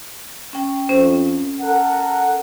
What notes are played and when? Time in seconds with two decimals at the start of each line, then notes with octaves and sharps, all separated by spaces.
0.53 C#4 G5
0.89 F2 C#4 C5
1.61 A4 A#4 F#5